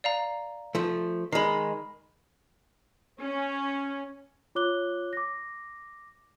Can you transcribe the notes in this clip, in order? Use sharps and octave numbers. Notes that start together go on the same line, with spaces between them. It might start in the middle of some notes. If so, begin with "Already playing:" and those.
D5 F5 A#5
F3 A3
D#3 G#3 B5 C7
C#4
F4 C#5 D6 F#6 G7
D6 A#6